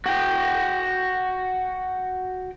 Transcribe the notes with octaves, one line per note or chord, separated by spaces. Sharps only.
F#4 G5